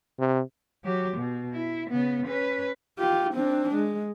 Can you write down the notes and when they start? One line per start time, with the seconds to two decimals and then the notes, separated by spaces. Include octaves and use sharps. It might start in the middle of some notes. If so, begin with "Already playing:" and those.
0.20 C3
0.84 F#3 G4
1.17 B2
1.54 E4
1.90 C#3 B3
2.26 C#4 B4
2.99 F4 G4
3.34 C4 D4
3.75 G#3